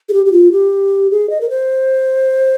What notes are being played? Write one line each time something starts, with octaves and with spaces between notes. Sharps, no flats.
G#4
G4
G4
F4
G4
G#4
D#5
A#4
C5